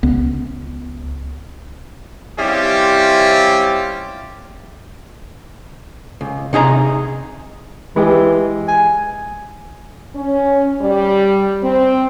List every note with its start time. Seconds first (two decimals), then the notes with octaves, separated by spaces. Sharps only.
0.03 C#2 B3
2.39 G3 C4 C#4 E4 F4 G4
6.21 C#2
6.53 C3 D#4 G#4 A#5
7.96 E3 G#3 G4
8.68 G#5
10.14 C#4
10.81 G3
11.63 C4